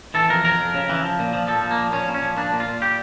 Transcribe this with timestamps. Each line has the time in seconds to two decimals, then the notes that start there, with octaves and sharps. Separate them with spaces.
0.14 E3 A4
0.29 F2 A#4
0.44 F2 A#4
0.59 F2
0.74 C#3
0.89 E3
1.04 F3
1.19 A#2
1.33 F3
1.47 F3 A4
1.63 A#2
1.71 A#3
1.78 F3
1.92 A#2 C#4
2.08 A#2
2.14 C#4
2.23 F3
2.37 A#2 D4
2.52 A#2
2.60 F4
2.67 A#2
2.82 G3 G4